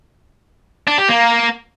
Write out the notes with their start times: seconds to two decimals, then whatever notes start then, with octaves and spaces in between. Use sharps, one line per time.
0.87 D4
0.98 G4
1.09 A#3